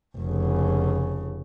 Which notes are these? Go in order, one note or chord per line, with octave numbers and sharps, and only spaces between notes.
F1 C#3